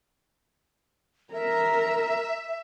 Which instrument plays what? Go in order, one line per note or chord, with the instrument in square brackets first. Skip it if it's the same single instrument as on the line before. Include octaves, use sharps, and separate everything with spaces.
[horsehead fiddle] A#4 [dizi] E5